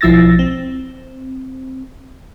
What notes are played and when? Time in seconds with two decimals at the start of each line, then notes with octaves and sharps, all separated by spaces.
0.01 B1 F3 E4 E6 A6 A#6
0.39 C4